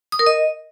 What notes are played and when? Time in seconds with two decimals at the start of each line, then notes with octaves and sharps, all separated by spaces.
0.12 D#6
0.19 A#4
0.26 D#5